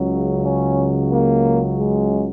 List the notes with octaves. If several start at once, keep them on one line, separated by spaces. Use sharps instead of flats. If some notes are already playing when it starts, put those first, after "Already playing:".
Already playing: C#2 C#3 F#3
C#4
A#3
G#3